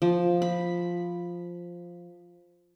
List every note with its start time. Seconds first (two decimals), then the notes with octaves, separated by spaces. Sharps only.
0.02 F3
0.42 B5